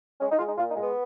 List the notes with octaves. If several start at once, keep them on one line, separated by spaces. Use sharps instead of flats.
G#3 C#4
D#4
G#3 F4
D#4
A#2 F4
D#4
G#3
B3